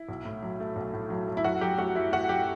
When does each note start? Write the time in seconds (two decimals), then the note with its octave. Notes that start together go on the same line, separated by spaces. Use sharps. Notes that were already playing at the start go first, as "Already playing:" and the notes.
Already playing: E4
0.09 B1
0.25 A2
0.43 F#3
0.60 A3
0.76 B1
0.94 A2
1.10 F#3
1.27 A3
1.37 E4
1.44 F#2 F#4
1.61 F#3 G4
1.78 A3 F#4
1.95 F#2 E4
2.12 F#2 F#4
2.29 F#3 G4